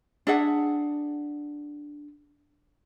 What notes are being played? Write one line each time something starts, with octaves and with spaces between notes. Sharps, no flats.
D4 G#4 E5 F#5